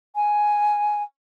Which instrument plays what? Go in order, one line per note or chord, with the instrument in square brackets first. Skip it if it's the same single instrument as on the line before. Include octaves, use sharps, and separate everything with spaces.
[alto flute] G#5